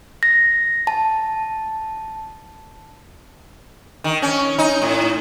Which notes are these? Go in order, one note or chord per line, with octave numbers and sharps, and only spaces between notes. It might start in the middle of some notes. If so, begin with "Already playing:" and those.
A#6
A5
D#3
C#4
D#4
A2